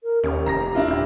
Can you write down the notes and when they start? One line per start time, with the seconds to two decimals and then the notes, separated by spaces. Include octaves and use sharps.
0.03 A#4
0.24 D#2 C#4 G4
0.46 F1 A#5 A#6
0.74 D4 E4 F4
0.88 D#1 G4